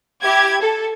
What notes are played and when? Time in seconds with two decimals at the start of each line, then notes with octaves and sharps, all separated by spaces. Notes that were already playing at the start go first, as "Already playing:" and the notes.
0.23 E4 G4 G#6
0.61 A4